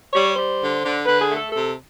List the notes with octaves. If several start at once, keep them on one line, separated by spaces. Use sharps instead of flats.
G3 C#5
G3 C5
D3
D3
D3 B4
G#4
A3
A4
C3 A4